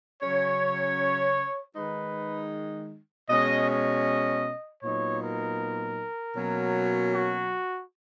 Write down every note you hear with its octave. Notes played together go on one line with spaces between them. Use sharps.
C#3 F#3 C#4 C#5
D#3 G#3 D#4 B4
B2 G#3 C#4 D#5
D#5
A#2 F#3 B3 D#4 C#5
A#4
B2 F#3 A#3 C#4
F#4